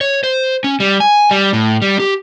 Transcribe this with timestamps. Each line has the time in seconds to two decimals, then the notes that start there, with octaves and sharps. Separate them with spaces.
0.01 C#5
0.23 C5
0.64 C#4
0.80 G3
1.00 G#5
1.31 G3
1.53 A2
1.82 G3
2.00 G4